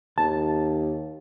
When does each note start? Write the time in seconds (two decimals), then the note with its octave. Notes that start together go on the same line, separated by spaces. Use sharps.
0.18 D#2 A5